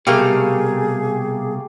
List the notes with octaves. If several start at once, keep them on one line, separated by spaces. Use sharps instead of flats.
C2 G#2 B2 A3 A#3 G4 G#4 F5